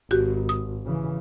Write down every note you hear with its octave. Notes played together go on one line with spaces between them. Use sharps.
G#1 F#4 G4
D#6
C#3 E3